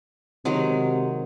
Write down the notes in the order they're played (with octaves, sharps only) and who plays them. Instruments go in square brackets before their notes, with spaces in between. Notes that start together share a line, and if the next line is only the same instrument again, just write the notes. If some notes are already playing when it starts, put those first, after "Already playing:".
[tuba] C3 [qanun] D#3 F#3 G#3